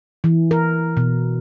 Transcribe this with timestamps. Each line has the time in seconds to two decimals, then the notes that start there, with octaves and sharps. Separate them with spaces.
0.24 E3
0.51 A#4
0.97 B2